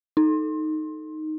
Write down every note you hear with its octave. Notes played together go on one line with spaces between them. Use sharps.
D#4